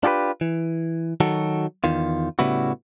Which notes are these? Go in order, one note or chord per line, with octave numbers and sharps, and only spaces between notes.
D4 F4 G4 G#4 B4
E3
D#3 F#3 F#4 A4
E2 D#3 F4
A2 C#3 G3 B3 E4 F#4